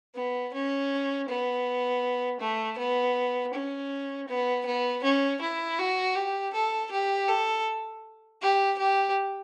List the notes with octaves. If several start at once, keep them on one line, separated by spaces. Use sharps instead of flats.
B3
C#4
B3
A3
B3
C#4
B3
B3
C#4
E4
F#4
G4
A4
G4
A4
G4
G4